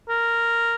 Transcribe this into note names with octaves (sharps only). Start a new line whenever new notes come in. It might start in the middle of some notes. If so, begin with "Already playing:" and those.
A#4